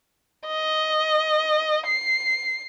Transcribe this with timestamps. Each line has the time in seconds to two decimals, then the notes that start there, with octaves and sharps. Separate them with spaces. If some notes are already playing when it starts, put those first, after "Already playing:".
0.48 D#5
1.87 C7